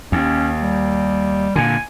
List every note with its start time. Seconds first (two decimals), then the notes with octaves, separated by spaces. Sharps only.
0.12 D#2 C#4
0.61 G3
1.56 A#2 D3 G#5